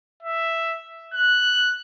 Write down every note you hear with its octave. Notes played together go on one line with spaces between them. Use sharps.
E5
F#6